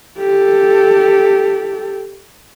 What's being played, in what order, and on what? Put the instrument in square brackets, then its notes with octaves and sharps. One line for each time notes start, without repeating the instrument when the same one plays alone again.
[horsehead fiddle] G4 A4